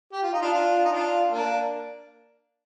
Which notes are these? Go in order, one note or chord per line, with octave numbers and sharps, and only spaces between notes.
G4
F4
D#4
D4 F4
D4 F4
D#4
D4 F4
A#3 D4